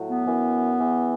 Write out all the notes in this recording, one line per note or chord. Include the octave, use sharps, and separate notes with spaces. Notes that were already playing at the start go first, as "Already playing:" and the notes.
Already playing: A2 F#3
B3
F#2 E3
E2 E3